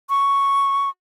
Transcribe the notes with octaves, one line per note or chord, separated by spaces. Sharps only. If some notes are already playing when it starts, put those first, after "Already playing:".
C#6